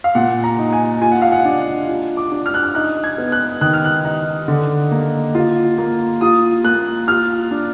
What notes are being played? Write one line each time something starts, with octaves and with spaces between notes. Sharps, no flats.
F5
A#2 F#5
A#5
D#4
G#5
F4 G#5
F#5
F5
F#5
D4
F4
D6
D4
F6
F#6
F6
D#4 F#6
G#6
B3
F#6
D#3 F#6
F6
F#6
D#4
D3
A#3
F4
A#3
F4 D#6
A#3 F#6
F4 F6
D4